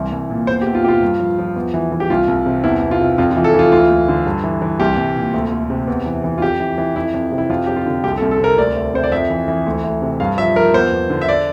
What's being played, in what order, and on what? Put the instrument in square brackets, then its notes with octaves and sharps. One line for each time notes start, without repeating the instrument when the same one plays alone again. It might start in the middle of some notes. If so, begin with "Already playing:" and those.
Already playing: [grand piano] C2 E3
C2
A#2
E2 C5
G4
E2
F4
C3 G4
F4
G2
F3
F3
E2
E3
E3
G4
C2 F4
C2
C3
E2 E4
E2
F4
C3
F2 F4
F4
E3
A4
E3 F4
D2 F4
D2
D3
G2
E3
E3
C2 G4
C2
A#2
D2
D2
C3
E2
E3
E3
F4
F2 G4
E3
E3
F2 E4
F2
C3
E4
F2 F4
F2 G4
F4
D3
C2 G4
A4
C2
A4
C3 A#4
D2 D5
D2
C3 C5
D5
F2 E5
E3
E3
D2
D2
C3
G2 F5
F3 E5
F3 A#4
E2 C5
E2
D3
E5
D5